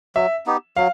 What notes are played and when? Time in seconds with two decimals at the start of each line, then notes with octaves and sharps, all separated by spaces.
0.16 F#3 E5
0.46 B3 D#4 G4
0.77 F#3 F5